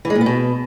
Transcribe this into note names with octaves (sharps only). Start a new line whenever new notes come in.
E3
G#3
A#2
B3
B2